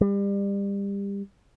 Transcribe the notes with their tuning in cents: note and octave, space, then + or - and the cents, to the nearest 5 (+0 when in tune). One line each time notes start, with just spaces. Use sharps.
G3 +30